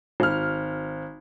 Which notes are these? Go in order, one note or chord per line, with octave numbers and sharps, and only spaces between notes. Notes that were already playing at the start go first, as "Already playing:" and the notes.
G#1 F6